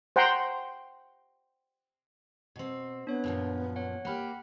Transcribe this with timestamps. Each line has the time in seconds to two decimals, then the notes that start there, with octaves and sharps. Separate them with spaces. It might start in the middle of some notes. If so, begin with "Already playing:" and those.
0.16 C5 F#5 G5 A#5 C6
2.56 B2 C4
3.07 B3 D4 C#5
3.24 F#2 A#2 F3
3.76 C#5 F#5
4.05 A#3 G4 F#5 B5 F6